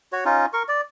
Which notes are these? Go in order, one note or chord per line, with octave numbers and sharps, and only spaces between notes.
F#4 C#5
C#4 D#4 F4
A#4 C#6
D5